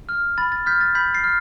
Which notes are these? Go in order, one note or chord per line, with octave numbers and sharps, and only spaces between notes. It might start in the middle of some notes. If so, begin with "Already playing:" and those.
F6
B5 A6
A6
F6 G6 B6
A6
B5 G6 B6
A6 C7
F6